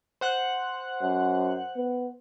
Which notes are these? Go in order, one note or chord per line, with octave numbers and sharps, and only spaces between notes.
C5 F#5 F#6
F#2
B3